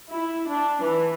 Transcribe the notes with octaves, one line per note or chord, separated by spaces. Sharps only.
E4
D4
E3